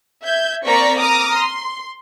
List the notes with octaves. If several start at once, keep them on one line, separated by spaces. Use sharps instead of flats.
E5 G6 G#6
A#3 C4 D5 A#5 C#6 B6
A#5 D6 D#6 F6
C6